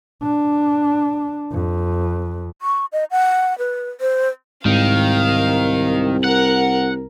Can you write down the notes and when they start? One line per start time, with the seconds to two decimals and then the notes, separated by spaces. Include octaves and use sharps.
0.23 D4
1.52 F2
2.62 C#6
2.92 D#5
3.11 F#5
3.58 B4
4.01 C5
4.65 C2 G#2 D#3 F5
6.24 A#4 F#5